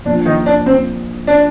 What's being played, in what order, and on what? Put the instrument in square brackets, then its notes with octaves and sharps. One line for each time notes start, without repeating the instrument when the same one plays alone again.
[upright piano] A#1 A#2 F3 [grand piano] D4
[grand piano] D#3 D#4
D4
C4
D4